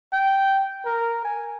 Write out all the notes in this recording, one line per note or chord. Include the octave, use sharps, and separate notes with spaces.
G5
A#4
G#5